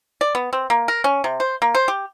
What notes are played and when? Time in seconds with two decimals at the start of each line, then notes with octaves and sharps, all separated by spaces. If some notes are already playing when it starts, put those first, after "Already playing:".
0.21 D5
0.35 B3
0.53 C4
0.70 A#3
0.88 A#4
1.04 C#4
1.24 C3
1.40 C5
1.62 A#3
1.75 C5
1.88 G4